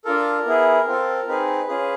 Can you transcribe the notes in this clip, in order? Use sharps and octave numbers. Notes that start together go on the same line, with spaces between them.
D4 F4 A4 A#4
B3 E4 G#4
C4 F4 A4
C4 D#4 G#4 B4
C#4 F4 G#4